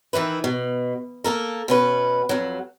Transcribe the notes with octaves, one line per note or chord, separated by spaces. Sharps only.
D#3 E3 E4 B4
B2
A#3 A4 A#4
B2 C#4 B4
F2 F#3